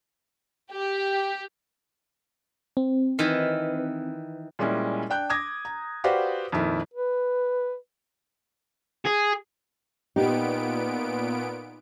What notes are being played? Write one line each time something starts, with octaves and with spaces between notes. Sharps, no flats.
G4
C4
D#3 E3 B4
A#2 G3 G#3 C#4 E4
D4 G5 F#6 G6
D6 D#6 G#6 A#6
A#5
F#4 G4 B4 C5 D5 F5
F2 A#2 D#3 E4
B4
G#4
A#2 B3 D#4 G4 D7